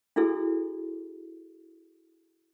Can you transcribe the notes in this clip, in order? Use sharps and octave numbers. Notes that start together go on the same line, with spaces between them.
D4 E4 F#4 G#4 A4